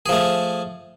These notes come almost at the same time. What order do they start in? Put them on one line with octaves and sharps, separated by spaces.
G#4 F3 A3